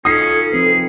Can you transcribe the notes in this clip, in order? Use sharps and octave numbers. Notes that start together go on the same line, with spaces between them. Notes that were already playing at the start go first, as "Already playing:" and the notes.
C#4 D#4 F4 F#4 A4 D#6 C7
F3 C4 G#4 B4